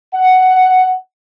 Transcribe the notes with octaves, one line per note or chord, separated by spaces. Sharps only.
F#5